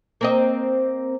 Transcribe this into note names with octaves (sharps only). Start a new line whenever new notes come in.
A#3 C4 D#5